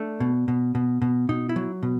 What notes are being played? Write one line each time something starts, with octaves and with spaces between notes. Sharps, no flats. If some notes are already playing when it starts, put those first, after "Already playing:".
Already playing: A3 D4
B2
B2
B2
B2
B2 D#4
E4
F#3
B2